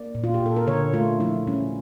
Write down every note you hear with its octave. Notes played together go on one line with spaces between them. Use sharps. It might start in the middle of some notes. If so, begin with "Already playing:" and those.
Already playing: A#3 D5
A#2
F4
G4
A#2
A4
A#4
D3 C#5
A3 F4
F3 E4
G3 C#4